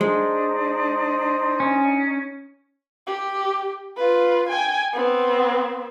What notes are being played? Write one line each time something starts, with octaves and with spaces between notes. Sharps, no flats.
G#3 D4 D#4 C5
C#4
G4
F4 B4
G5 G#5
B3 C4